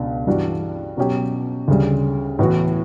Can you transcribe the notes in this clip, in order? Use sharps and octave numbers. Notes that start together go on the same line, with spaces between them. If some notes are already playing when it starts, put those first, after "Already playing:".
Already playing: C#2 B2 D4
G2 E3 G3 D4 F#4
B2 F#3 C#4 G4
D2 C#3 G3
A2 E3 B3 F#4